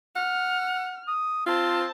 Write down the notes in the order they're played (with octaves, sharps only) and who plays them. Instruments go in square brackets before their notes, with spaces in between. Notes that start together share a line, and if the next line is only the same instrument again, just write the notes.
[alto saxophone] F#5 [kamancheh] F6
[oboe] D#6
[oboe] C4 [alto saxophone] F4 [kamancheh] C5 A5